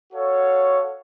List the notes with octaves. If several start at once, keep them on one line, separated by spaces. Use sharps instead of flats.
F#4 A4 C#5 F5